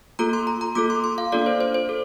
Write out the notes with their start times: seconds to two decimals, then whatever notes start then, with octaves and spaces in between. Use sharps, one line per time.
0.19 A#3 F4 A4 A#5
0.33 C6
0.47 A#5
0.61 A#5
0.75 A#3 F4 A4 D6
0.90 C6
1.04 C6
1.18 F5
1.32 A#3 D4 F4 A4 D5
1.46 C5
1.61 C5
1.74 C5
1.89 A4